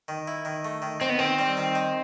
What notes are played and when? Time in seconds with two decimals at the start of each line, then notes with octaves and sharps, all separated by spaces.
0.08 D#3
0.28 E4
0.45 D#3
0.65 A3
0.82 D#3
1.01 C4 D#4
1.09 B3
1.19 D#3 C4
1.39 G3
1.57 D#3
1.75 D#4